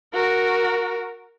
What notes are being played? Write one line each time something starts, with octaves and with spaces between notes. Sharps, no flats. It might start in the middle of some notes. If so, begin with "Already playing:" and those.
F#4 A#4